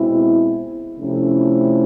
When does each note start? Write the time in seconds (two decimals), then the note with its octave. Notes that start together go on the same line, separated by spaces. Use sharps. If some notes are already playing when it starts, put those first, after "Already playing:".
Already playing: B2 G#3 C4 E4
0.99 C3 F3 A3 C#4 E4